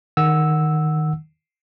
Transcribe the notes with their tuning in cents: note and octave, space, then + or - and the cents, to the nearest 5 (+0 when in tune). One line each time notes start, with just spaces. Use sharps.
D#3 +0 F#5 +0 E6 -10